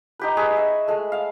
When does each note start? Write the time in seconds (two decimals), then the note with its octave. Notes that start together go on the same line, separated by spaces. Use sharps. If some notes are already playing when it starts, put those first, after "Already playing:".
0.19 D#4 G4 B4
0.37 G#4 B4 C#6
0.57 E5
0.88 G#3 A3
1.12 F5